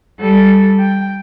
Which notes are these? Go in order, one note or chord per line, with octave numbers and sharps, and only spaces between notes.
G3 A4
G5